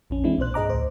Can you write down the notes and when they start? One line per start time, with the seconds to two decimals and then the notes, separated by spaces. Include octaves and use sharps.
0.10 A#1 F2 C#4
0.24 E3 G#3 C4 D4 E4
0.38 B1 A#2 D4 C5 F#6
0.54 G2 G#4 D#5 A#5 D6
0.69 D2 A2 C5